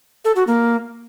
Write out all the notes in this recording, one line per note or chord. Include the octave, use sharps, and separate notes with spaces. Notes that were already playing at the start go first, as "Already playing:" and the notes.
A4
F#4
A#3